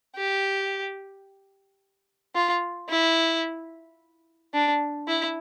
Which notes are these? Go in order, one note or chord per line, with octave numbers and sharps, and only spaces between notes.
G4
F4
E4
D4
E4